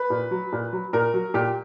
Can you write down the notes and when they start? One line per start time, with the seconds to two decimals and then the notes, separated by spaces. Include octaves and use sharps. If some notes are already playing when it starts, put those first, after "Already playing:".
Already playing: B4
0.10 A#2
0.31 F#3
0.52 A#2
0.73 F#3
0.93 A#2 A#4
1.14 F#3
1.34 A#2 G4